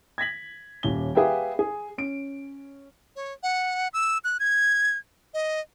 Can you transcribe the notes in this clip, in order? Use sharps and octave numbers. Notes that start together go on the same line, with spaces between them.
G#6 A#6 B6 F#7
D#1 C#4 G7
G4 G#4 B4 E5 F5 G5
G#4
C#4 D7
C#5
F#5
E6
F#6
G#6
D#5